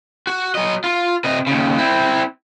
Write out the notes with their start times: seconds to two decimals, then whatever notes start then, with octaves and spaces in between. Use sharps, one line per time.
0.27 F#4
0.55 F#3 D#5
0.84 F4
1.24 C3 D#5
1.47 D#2 C#3
1.78 C4 E4